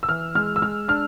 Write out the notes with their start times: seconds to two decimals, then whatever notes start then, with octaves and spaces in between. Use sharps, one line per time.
0.03 E6
0.08 E3 F6
0.35 G#3 F6
0.56 E6
0.62 G#3 F6
0.88 D4 F6